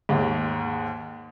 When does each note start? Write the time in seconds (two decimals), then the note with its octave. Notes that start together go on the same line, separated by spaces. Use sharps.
0.09 D#2 G#2